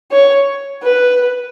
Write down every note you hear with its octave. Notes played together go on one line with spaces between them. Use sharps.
C#5
B4